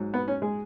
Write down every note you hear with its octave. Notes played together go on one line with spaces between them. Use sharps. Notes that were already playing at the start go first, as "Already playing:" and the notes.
Already playing: G#2 F#3
B3
C#4
G#3 G#4